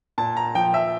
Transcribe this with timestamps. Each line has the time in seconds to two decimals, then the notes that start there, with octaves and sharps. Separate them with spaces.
0.18 A#2 A5
0.37 A#5
0.55 F3 G5
0.74 E5